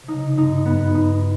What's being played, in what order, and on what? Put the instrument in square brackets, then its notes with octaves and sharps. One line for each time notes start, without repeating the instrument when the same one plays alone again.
[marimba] C3
[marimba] C#3 [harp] D#4
[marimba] C#3
[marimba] G2 [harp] D#4
[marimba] G2
[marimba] F#2 [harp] B3
[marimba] G2 [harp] D#4